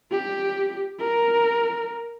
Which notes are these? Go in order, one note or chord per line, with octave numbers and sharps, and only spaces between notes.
G4
A#4